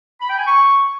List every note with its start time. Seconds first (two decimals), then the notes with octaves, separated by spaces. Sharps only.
0.21 B5
0.29 G5
0.38 G#5
0.46 C#6